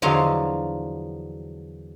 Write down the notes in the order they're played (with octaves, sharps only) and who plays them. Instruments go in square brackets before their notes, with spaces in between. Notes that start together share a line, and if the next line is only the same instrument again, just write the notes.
[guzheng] E2 D3 F3 F#3 D#5 F5